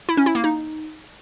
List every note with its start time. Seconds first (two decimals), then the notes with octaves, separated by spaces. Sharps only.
0.09 E4
0.17 C#4
0.26 E4
0.35 A#3
0.44 D#4